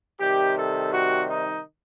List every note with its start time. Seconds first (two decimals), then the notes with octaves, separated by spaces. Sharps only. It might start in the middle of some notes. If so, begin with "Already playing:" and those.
0.21 C3 D#3 G3 G4
0.57 A4
0.93 F#4
1.29 D#4